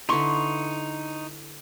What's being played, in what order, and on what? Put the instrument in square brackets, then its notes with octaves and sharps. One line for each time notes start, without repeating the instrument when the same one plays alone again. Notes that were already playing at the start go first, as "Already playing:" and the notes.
[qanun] D3 E4 B4 [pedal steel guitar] D#4 C6 C#6